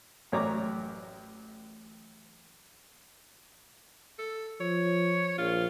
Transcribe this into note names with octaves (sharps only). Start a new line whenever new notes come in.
A1 F#2 C#5 D5 A#5 D6
A4
F3 C#5
A#1 F4